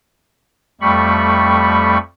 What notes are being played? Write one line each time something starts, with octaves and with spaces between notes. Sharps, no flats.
F2 G3 A3 B5 C#6